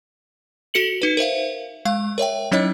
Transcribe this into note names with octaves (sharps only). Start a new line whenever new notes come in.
F#4 A4 C#7 F#7
D#4 B4
A#4 C5 E5 F5
G#3 F5
A#4 C#5 E5 G5
F#3 C#4 D#4 E4 C#5 D#5